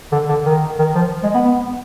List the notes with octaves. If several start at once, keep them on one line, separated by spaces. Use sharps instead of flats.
D3
D3
D#3
D#3
F3
G#3
B3
B3